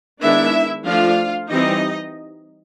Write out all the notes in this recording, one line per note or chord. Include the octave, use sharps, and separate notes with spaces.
D#3 G#3 B3 D4 E4 E5
F3 A3 D4 F4 F5
E3 G3 C4 D#4 D#5